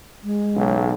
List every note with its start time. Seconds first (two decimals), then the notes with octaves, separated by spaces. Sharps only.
0.24 G#3
0.55 B1 C#3